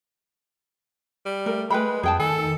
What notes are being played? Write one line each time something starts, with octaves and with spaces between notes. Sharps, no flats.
G3
A3 A#4
G#3 B4 G5 B5
F2 G#4 G5 A5
D#3 A4 G#5